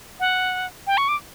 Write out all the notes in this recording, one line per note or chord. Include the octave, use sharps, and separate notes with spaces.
F#5
G5
C#6
D6